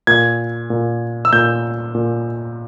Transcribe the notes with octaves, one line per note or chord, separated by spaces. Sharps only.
A#2 G#6
A#2
E6
A#2 G6
A#2